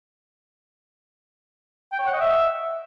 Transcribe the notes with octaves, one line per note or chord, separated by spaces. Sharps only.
G5
C#5
F#5
D#5
E5